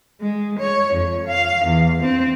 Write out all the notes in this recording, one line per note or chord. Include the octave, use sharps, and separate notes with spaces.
G#3
C#5
F2
F5
E2
C4